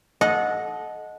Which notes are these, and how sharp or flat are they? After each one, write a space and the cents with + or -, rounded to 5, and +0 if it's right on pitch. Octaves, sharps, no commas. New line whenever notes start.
A4 -25 D#5 +0 F#5 -20